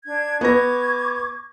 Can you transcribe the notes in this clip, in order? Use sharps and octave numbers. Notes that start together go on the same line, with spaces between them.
D4 G#6
B3 C#6 D6 G#6 A#6